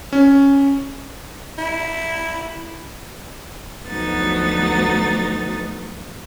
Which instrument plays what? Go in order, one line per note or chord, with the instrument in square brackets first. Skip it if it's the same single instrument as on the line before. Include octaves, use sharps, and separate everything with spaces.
[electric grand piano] C#4
[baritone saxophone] E4
[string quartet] D2 F3 F#3 B3 D#4 A6